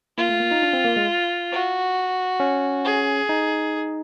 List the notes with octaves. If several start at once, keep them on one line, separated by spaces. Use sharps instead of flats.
A#3 F4
A3
A#3
D#4
D4
C4
A#3
G#3
F#4
C#4
G#4
D#4